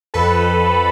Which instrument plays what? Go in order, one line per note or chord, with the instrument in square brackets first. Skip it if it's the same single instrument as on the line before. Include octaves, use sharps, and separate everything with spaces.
[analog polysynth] F2 A4 B4